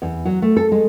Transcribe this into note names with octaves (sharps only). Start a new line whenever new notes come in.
E2
F#3
A3
A4
G#3